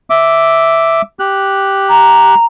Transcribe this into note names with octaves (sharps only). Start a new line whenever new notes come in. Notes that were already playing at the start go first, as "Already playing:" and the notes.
E5 D6
G4 F#6
A#5